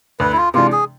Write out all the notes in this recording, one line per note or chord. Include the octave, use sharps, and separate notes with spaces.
D2 B4
E4
F4
C3 E3 G#3 D4 F4
G#4